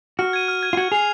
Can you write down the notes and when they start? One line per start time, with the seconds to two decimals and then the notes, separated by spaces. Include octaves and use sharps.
0.19 F#4 F6
0.33 G#6 D#7
0.48 F6
0.63 G#6 D#7
0.73 F4
0.77 F#4 G#6
0.92 G#4 C7 F7